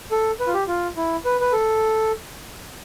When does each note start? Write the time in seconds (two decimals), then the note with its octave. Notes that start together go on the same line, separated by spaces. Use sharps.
0.11 A4
0.40 B4
0.47 F4
0.54 G4
0.68 F4
0.97 E4
1.25 B4
1.41 B4
1.52 A4